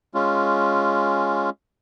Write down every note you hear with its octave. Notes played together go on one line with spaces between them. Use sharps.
G#3 C#4 F4